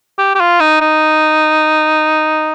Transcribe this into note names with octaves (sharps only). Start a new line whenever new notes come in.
G4
G4
F4
D#4
D#4